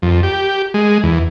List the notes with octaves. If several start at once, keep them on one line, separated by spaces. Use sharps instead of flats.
F2
G4
G#3
E2